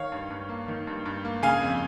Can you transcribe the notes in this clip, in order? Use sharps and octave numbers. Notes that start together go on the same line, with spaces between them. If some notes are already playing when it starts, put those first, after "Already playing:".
Already playing: D#3 C#5 F5
G2
G2
A#3
D#3
G2
G2
A#3
C#3 F5 G#5
F2